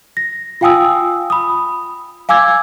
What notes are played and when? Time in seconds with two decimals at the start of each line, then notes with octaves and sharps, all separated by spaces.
0.17 A#6
0.61 F4 F5 G5 G#5 D#6 E6
1.30 B5 D#6
2.29 F5 G#5 D6 E6 G#6